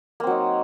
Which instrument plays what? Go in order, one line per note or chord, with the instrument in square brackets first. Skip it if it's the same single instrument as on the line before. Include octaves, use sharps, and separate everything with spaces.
[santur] A#3
C4
F#3
D#4